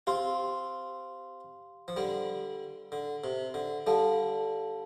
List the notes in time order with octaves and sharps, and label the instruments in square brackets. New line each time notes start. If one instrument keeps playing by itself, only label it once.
[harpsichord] C4 F4 [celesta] G4 F5 C6
[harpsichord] F3
D3 G3
D3
C3
D3
[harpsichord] D3 G3 [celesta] A4 F5 A5